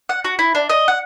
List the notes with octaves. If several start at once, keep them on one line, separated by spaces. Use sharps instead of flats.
F#5
F#4
E4
D4
D#5
F#5